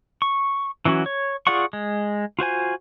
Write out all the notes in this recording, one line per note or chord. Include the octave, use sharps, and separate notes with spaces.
C#6
E3 F#3 C#4 F#4
C#5
F4 G#4 D5 F#5 C#6
G#3
F4 F#4 C5 G#5